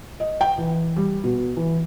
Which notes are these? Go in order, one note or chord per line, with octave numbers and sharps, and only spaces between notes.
D#5
G5
E3
G3
B2
E3